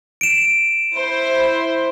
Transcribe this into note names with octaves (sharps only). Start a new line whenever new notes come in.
D7 E7
E4 C5